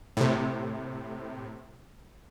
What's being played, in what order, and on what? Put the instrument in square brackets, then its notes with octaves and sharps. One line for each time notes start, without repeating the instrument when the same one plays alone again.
[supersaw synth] A2 C3